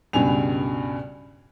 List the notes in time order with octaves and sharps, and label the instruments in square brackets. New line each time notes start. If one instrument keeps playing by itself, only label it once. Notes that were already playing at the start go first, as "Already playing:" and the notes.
[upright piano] C#2 G2 B2 G#5 F7